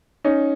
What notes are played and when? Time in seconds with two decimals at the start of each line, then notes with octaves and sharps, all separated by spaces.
0.24 C#4 D#4